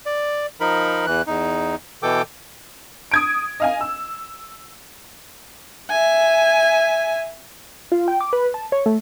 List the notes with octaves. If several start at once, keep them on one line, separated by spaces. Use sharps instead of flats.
D5
F3 D#4 A#4 B5
E2 E3 F#6
E2 D#4
B2 E3 A4 G5 D6
D#6 G#6 D7
D#5 F5 G#5
E6
E5 G#5
F4
G5
D6
B4
A5
C#5
A3